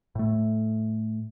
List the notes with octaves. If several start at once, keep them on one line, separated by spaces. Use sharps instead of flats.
A2 A3